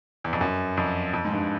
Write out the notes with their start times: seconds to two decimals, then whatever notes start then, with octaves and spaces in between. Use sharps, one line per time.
0.24 E2
0.33 F2
0.41 F#2
0.77 F2
1.14 F2
1.25 G#2
1.32 G2